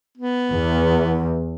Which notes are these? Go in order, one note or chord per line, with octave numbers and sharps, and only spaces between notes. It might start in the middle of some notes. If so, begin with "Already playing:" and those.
B3
E2